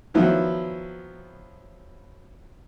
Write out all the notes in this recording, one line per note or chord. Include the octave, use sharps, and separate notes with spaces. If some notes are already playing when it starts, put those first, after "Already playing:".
D#3 F3 F#3 B3 E4